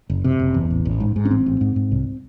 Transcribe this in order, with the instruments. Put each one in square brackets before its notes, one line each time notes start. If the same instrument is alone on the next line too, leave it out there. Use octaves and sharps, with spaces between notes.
[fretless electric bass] F#1
C3
F#1
E2
A1
A1
G#2
G#2
C#4
A1 C4
A1
G#2
G#2
C2